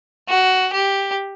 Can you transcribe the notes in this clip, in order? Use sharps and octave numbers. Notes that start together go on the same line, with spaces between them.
F#4
G4